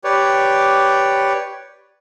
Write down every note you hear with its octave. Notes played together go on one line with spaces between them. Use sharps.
G4 B4 C#5 D5